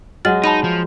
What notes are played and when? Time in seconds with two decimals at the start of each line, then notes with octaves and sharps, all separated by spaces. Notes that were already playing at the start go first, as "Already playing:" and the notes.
0.25 F#3 G#3 F6 A6 F#7
0.44 D#4 A5 B5 D#7
0.64 F3